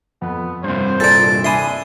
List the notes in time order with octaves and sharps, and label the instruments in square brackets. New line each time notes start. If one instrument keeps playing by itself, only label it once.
[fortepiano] F2 [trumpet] B3
[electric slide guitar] G2 C3 [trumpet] C5
[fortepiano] A#2 A#3 [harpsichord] A4 D5
[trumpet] D4 [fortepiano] E5 G#5 B5 [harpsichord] C6 D#6